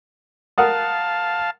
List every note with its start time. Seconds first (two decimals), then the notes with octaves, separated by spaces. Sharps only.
0.58 A#4 F5 F#5 A5 D#6